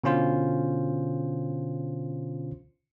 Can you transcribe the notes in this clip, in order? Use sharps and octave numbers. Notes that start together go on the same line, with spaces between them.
B2 D3 C#4 F4 C5